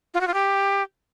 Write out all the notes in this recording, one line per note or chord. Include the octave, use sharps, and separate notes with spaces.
F4
F#4
F4
G4